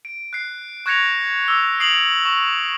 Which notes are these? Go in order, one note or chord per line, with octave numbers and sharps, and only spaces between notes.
D7
F#6 C7
C#6 F#6 G#6 A#6 C#7 F7
D6 E6
D#6 C7 D7 F7 F#7
C#6